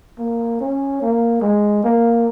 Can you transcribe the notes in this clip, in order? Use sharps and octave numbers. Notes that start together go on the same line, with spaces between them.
A#3
C#4
A#3
G#3
A#3